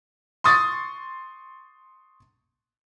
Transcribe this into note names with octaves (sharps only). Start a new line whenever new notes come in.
C6 C#6 D#6 A6